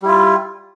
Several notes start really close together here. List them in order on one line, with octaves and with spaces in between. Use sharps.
G3 E4 F4